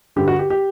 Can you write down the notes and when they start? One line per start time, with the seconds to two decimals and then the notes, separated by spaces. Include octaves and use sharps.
0.16 G2 D3 G4
0.28 F#4
0.39 G4
0.50 G4